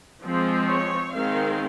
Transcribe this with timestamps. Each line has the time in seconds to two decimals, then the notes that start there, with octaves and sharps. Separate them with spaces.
0.24 F3 G#3 C4
0.69 C#5
1.13 D#3 G#3 C4 F5